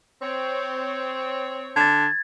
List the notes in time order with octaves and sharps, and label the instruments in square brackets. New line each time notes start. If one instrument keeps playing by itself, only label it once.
[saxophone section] C4 C#5
[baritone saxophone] D3 [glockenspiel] G#6 A6